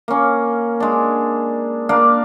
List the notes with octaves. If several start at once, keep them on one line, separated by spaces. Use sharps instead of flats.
A#3 C#4
G#3 D4
A#3 D4 D5 F5